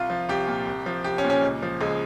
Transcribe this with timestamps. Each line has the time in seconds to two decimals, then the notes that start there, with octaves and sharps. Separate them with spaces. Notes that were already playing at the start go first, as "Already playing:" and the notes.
Already playing: C2 F4
0.10 F3
0.29 C2 G4
0.48 A#2
0.67 C2
0.86 F3
1.04 C2 G4
1.18 C#4
1.24 A#2
1.30 C#4
1.42 C#2
1.63 F3
1.81 C#2 G#3